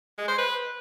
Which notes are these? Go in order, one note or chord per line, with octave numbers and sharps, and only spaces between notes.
G#3
C5
B4